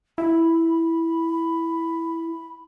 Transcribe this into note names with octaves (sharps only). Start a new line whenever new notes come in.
E4 B5